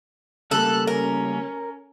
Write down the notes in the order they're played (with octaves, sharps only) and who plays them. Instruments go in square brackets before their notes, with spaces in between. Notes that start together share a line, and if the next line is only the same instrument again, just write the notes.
[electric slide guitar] C#3 G3 A#3 [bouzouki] A4 [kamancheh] F#6
[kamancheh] C#4 [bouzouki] A#4